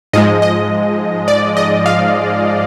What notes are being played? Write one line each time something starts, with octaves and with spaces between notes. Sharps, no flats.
G#2 F3 G#3 D#5
D#5
D5
D#5
F5